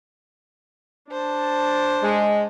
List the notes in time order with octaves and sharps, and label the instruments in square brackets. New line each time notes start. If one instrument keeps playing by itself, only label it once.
[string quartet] D4 C5 A5
[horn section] G#3